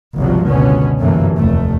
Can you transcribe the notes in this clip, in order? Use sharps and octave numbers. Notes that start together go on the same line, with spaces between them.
G#1 C#2 G2 C3 F3 F#3
F#1 C#2 B2 D3 B3 C#4
G1 F#2 C3 E3 A3 A#3
F1 D#2 A3